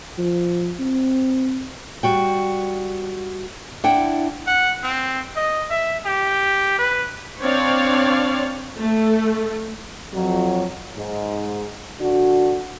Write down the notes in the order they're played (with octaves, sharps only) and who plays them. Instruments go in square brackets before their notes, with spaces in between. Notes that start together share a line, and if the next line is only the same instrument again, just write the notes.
[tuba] F3
C4
[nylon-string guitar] G3 F#4 G5
D4 E4 F#5 G5
[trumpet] F#5
C4
D#5
E5
G4
B4
[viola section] C4 D4 C#5 D5 F5
A3
[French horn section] F2 F#3
G#2
D3 D4 F#4